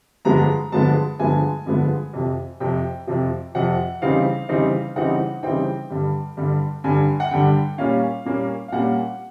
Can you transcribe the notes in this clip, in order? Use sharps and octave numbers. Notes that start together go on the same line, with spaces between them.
G2 D3 F3 G#3 B3 A#5
G2 D3 F3 G#3 B3 A5
G2 D3 F3 G#3 B3 G#5
G2 D3 F3 G#3 B3
F2 C3 F3
F2 C3 F3 G5
F2 C3 F3
F2 C3 F3 F#5
C#3 E3 G3 C4 D#4 F5
C#3 E3 G3 C4 D#4
C#3 E3 G3 C4 D#4 F#5
C#3 E3 G3 C4 D#4 G5
G2 D3 G3
G2 D3 G3
G2 D3 G3 G#5
F#5
G2 D3 G3 G5
A#2 G3 A#3 C#4 F5
A#2 G3 A#3 C#4
F5
A#2 G3 A#3 C#4 F#5